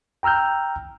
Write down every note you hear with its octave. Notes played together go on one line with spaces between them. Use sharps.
G5 A#5 E6 F6 G6